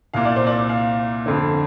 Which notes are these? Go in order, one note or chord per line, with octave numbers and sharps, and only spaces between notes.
C2 A#2 F5
D5
C5
D5
F5
F2 D3